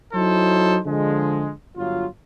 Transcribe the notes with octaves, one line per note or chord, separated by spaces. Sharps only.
F#3 D#4 E4 A4 C5
D3 F3 G#3
G1 F#3 F4